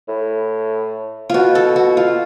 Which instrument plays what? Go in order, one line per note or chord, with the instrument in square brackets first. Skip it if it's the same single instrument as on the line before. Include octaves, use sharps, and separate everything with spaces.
[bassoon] A2
[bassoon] B2 [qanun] F4 F#4
[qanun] A4
F#4
F4